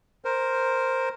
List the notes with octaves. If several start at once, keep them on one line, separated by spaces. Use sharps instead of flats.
A#4 C5